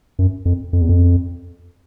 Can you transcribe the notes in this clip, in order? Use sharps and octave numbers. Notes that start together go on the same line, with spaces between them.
F#2
F2
F2
E2
F2